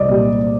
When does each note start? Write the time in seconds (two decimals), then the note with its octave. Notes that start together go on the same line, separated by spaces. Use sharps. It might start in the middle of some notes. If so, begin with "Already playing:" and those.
Already playing: C2 D5 D#5
0.09 A#2 G3